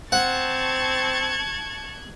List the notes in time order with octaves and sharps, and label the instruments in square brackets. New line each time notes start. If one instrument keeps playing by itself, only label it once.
[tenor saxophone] C4 [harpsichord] F#5 [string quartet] A5 C#6 A6 [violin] F#6 G#6